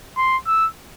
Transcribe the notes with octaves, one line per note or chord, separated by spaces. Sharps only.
C6
E6